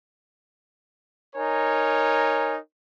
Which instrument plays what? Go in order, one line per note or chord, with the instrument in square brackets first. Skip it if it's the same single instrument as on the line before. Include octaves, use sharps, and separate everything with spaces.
[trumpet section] D#4 A#4 C#5 G#5